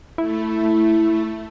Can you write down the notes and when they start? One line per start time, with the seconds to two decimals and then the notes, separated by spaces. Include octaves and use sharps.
0.18 A3 E4